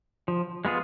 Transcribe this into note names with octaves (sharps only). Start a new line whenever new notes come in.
F3
G#3 B3 F4 G#4